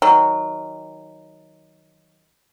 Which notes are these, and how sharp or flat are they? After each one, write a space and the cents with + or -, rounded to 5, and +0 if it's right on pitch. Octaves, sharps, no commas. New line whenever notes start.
D#3 +10 F#3 +5